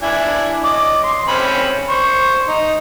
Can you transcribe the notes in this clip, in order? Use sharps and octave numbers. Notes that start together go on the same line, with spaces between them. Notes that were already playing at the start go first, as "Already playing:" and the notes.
D4 E4 G#5
D#5 D6
C6
C4 C#4 B5
C5 C#6
D#4